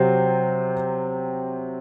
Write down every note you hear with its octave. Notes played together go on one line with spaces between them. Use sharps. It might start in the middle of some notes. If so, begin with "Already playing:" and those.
Already playing: C3 F#3 C4